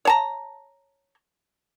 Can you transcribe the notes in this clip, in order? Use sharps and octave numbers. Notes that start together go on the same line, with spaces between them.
C#5 A5 A#5